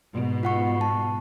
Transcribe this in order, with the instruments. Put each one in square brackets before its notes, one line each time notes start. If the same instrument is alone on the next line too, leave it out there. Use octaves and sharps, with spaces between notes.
[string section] G#2 B2
[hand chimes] F4 F#5 C#6
A5